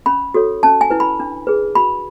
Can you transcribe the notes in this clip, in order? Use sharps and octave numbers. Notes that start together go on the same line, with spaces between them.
C#4 B5
F#4 A4 C#5
C#4 A5
G#5
E4 B4
B5
D4
G#4 B4
F#4 B5